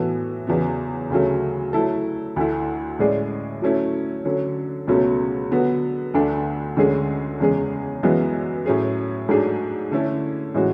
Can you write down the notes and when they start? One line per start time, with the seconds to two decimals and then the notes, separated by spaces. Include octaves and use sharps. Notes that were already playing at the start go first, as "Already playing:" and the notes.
Already playing: A2 E3 B3 F#4 A4
0.47 E2 C#3 F#3 B3
1.10 D2 C#3 F#3 A3
1.73 F#3 A3 E4 A4
2.36 D2 D3 A3 E4
2.99 A2 G#3 C#4 G#4 D5
3.62 F#3 A3 C#4 E4
4.25 D3 F#3 C#4
4.87 C#2 B2 F#3 A3 C#4
5.51 D3 F#3 B3 F#4
6.14 D2 D3 A3 D4
6.77 D2 D3 G#3 C#4 G#4
7.40 E2 C#3 G#3 C#4 G#4
8.03 F#2 E3 G#3 B3 F#4
8.66 A2 F#3 C#4 G#4
9.28 G#2 F#3 A3 D4 G#4
9.91 D3 A3 C#4 E4
10.54 A2 E3 G#3 C#4 F#4